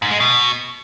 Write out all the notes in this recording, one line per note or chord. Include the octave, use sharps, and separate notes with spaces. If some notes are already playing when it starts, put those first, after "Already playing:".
G#2
G#3
B2